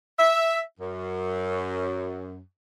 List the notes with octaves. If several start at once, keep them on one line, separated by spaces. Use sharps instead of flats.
E5
F#2